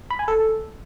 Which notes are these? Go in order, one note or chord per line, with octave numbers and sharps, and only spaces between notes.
B5
G#5
A4